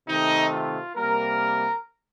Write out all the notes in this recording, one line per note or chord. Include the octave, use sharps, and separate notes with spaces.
C3 D#3 A3 D#4
F4
C3 G3 A#3 A#4